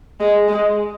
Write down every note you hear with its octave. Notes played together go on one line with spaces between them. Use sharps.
G#3
G#3